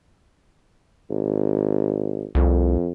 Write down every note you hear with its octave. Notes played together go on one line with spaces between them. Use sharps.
G#1
C2 F2